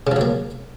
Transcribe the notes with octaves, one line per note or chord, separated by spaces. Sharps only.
C#3 F3 F#3 A#3